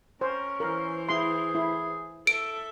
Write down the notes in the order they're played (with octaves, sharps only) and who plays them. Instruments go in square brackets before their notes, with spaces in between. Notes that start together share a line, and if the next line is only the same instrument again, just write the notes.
[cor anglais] C#4 [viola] A#4 [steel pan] C5
[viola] E3 C5 [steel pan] A#4
[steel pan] E4 C6 [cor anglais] G#4
[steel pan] E4
[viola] A4 E5 [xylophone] D7